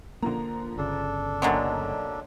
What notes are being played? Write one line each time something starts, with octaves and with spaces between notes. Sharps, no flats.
D3 F3 A#3 A#5
G1 C#3 D4 A4
B1 D3 F#3 G#3 A#3 A#5